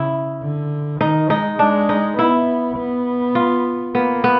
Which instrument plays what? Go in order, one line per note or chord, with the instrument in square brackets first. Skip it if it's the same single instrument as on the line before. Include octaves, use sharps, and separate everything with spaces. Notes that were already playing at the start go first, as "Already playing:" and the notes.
Already playing: [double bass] C#3 [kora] E4
[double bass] D3
[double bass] D#3 [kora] D#4
[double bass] G#3 [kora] D#4
[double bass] G#3 [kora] D4
[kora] D#4
[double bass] B3 [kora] E4
[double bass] B3
[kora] F4
[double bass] A#3 [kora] B3
[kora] B3